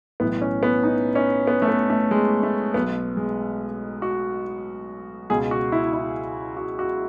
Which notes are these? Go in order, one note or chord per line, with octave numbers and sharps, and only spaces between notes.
B1 A2 E3 B3
C#4
B3
D#4
C#4
B3
A3
B3
A3
G#3
A3
B1 B2 B3
G#3
F#4
C#2 B2 G#4
F#4
E4
E4
F#4
F#4